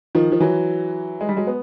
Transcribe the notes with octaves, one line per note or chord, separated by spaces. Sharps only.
D#3 F3
F3
E3 F#3
G#3
G3
F#3 G#3
B3